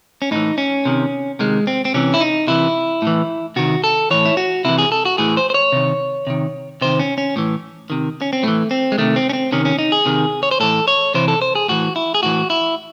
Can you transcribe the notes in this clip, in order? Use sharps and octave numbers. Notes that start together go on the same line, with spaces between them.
C#4
A2 E3 D#4
C#4
C3 D#3
C3 D#3 G#3
C4
C4
C3 E3 C#4
E4
D#4
C3 E3 E4
A2 E3
C3 D#3 F#4
A4
A2 E3 C#5
E4
F#4
C3 E3 E4
G#4
A4
F#4
A2 E3 G#4
C5
C5
C#5
C3 D#3
C3 D#3
C3 D#3 C5
C#4
C#4
A2 E3
C3 D#3
C#4
C4
A2 E3 A3
C4
G#3
C3 D#3 A3
C4
C#4
C4
C3 D#3 C#4
C#4
D#4
G#4
C3 D#3
C#5
C5
A2 E3 A4
C#5
C3 E3 C5
A4
C5
G#4
A2 E3 F#4
E4
G#4
A2 E3 F#4
E4